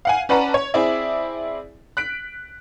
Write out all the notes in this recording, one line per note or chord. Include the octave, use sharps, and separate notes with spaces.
F5 F#5 G#5
C#4 B4 D5 F#5 A5 A#5
C#5
C4 E4 G#4 D5 E5
F#6 B6 D7